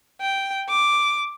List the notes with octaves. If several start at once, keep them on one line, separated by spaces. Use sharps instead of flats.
G5
D6